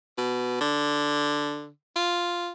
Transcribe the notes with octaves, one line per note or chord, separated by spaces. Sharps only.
B2
D3
F4